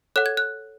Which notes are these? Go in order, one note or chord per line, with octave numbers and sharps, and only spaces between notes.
A4 C#5 F#5 F#6
G#6
F#6